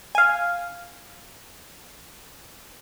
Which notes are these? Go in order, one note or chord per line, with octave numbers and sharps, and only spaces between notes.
F5 G#5